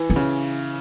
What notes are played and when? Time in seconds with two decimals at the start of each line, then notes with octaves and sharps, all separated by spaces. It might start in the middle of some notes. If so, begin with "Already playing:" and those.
Already playing: E3
0.10 E4
0.16 C#3